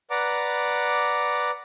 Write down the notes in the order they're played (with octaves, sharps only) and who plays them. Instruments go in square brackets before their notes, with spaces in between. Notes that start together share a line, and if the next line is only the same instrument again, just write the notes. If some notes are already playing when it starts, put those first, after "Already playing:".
[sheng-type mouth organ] B4 D5 F#5 A#5 D6